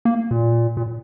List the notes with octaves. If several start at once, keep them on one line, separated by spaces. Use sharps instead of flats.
A#3
A#2
A#2